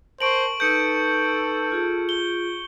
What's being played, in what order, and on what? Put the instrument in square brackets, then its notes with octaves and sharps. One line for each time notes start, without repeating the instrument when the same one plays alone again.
[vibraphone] A#4 A5 [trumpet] C5 [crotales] C#6 D7 F#7
[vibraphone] D#4 B4 [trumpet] A4 [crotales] G6 C#7
[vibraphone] F4 G#4
[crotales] G7